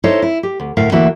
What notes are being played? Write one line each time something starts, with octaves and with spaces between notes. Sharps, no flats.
D#4 E4 A4 C5 C#5 D#5
E4
G4
D2
D2 A2 A#4 E5 F5
D2 E3 A#3 F#4 E5